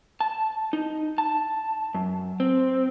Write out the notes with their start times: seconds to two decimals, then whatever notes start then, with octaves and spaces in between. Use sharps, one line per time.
0.20 A5
0.73 D#4
1.18 A5
1.95 F#2
2.40 C4